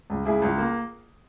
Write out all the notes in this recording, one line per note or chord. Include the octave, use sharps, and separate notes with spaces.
C#2
C#2 E4 G#4
C#2
A#3